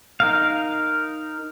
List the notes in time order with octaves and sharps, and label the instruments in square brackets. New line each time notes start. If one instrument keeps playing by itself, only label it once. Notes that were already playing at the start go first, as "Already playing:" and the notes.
[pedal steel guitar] D#4 A#4 F5